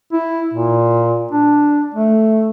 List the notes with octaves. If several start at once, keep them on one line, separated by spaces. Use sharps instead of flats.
E4
A#2
D4
A3